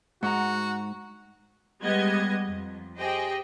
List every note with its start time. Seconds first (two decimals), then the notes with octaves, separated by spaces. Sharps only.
0.23 G#2 F#4 F#5 A#5
1.82 G3 G#3 B3 G4 D#5 G#6
2.45 F2
2.98 G4 G#4 C5 D#5 G5